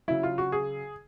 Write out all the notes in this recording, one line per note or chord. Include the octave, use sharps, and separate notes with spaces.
C#3 F#3 E4
F4
F#4
G#4